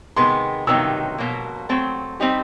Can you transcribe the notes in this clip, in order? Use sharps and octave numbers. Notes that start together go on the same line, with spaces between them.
C3 D#3 G#3 B3 C6
C3 D#3 F#3 B3 D#4 E6
B2 F#3 A#3
F#3 A3 C4
G3 C4 D#4 G4